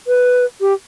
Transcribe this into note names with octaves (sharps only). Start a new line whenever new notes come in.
B4
G4